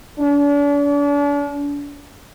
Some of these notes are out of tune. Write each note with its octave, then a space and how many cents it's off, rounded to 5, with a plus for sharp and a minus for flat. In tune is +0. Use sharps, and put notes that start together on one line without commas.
D4 -40